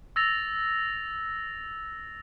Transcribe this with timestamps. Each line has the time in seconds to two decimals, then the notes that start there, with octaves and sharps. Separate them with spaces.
0.16 E6 A6 A#6 F7